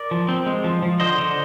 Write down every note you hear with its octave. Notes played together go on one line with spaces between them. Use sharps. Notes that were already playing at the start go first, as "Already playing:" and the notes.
Already playing: A#4 D5
F3
C4
G#3
F3
F3
D3 C5 D#5
D3